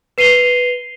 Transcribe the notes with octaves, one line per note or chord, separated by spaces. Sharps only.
B4 C7 D#7 F7 G7